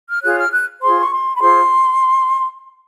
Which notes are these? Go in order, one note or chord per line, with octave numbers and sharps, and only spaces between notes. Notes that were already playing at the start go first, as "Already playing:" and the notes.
F6
F4 G#4 C#5 F#6
F6
F#6
F4 G#4 C5 C6
C#6
C6
B5
F4 G#4 C5 C6